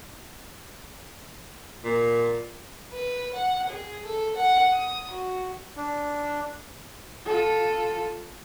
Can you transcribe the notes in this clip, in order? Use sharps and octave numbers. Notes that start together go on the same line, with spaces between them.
A#2
B4
F#5
G#4
A4
F#5
D#6
F#4
D4
F4 A4